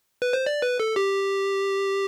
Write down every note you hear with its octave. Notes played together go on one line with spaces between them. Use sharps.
B4
C5
D5
B4
A4
G4